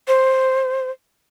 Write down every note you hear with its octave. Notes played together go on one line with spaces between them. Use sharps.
C5